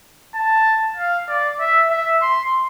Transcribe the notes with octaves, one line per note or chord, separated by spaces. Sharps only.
A5
F5
D5
E5
E5
C6